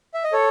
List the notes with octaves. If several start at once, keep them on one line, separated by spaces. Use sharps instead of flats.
E5
D#5
A4 C#5